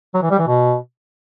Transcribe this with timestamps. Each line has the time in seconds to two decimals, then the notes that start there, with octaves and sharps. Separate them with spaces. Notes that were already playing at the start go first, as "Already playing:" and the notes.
0.14 F#3
0.22 E3
0.31 G3
0.39 E3
0.47 B2